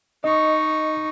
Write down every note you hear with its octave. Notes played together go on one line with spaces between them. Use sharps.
D#4 D#5 C#6